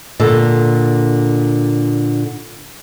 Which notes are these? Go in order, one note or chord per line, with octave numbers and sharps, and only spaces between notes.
A#2 D3 A4